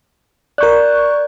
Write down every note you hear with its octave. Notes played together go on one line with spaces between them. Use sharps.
A#4 D5 C#6 F#6 G6